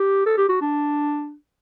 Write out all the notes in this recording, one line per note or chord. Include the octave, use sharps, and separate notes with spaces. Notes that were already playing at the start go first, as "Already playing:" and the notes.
Already playing: G4
A4
G4
F#4
D4